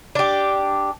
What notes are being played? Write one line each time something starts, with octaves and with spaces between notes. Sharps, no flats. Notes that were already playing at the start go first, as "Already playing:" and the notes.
D4 G4